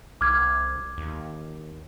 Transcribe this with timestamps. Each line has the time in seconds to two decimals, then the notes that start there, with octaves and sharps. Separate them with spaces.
0.21 C2 D6 F6 G#6
0.98 D#2